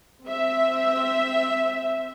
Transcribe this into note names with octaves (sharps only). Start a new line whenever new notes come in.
C4 E5